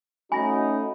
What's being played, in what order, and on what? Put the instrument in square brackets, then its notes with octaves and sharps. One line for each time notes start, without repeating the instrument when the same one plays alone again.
[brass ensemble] A3 C#4 D#4 [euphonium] F#4 [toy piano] G#5 [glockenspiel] B5 A#6